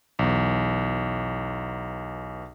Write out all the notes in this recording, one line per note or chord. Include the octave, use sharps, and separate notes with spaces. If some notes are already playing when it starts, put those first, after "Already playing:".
B1 E2